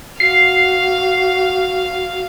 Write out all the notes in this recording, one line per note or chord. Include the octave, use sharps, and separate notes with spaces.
F#4 F5 C7